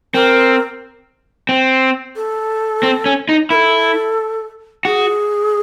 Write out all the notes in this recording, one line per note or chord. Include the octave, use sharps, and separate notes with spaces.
C4 A#4
C4
A4
C4
C#4
D#4
E4 A4 A#4
F#4 G#4